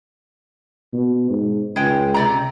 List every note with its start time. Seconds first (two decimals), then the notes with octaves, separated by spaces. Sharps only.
0.93 B2
1.30 G#2
1.76 C#2 G#3 G5
2.14 C3 D5 A#5